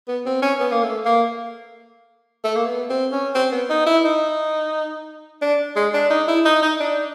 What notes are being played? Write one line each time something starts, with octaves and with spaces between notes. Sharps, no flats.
B3
C4
C#4
B3
A#3
A3
A#3
A3
A#3
B3
C4
C#4
C4
B3
D#4
E4
D#4
D4
G#3
D4
D#4
E4
D#4
D#4
D4